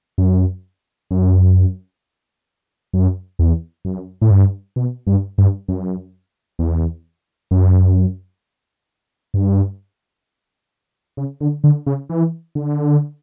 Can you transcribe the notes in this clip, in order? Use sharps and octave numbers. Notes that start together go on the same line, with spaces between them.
F#2
F#2
F#2
E2
F#2
A2
G2
B2
G2
G2
F#2
E2
F#2
G2
C#3
D3
D3
C#3
E3
D3